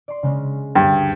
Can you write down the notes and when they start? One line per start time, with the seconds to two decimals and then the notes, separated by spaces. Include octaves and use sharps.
0.08 D5 C6
0.23 C#3 G#3 C#4
0.75 D2 G2